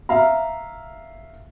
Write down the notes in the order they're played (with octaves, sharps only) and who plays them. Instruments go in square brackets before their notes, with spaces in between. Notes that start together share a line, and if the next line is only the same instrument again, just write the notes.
[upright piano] E5 F5 A#5